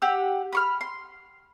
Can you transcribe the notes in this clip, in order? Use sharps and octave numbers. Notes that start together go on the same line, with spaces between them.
G4 F#5 E6
B5 C#6 F6
C6